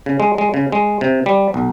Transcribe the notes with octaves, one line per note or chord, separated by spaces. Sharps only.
C#3
G#3
G#3
C#3
G#3
C3
G3
B1